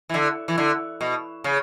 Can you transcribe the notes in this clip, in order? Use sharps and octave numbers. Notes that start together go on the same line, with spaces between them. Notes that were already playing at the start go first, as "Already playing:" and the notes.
E3
D3
E3
D3
B2
C#3